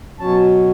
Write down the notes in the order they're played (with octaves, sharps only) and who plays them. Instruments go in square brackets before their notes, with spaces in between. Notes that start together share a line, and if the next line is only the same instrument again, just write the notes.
[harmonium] B2 F#3 C#4 A5